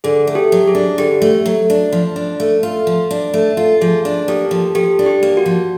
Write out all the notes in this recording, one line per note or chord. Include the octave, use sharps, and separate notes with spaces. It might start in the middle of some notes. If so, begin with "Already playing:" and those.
D3 G#4
A3
G4 A4
F#3
G#4
D4
D3 G4
A3
F#3
D4
F3
D4
A3
F4
F3
D4
A3
F4
F3 G#4
D4
A#3 G4 A4
F3
F3 G4 A4
D4
G4
A#3
F#4
F3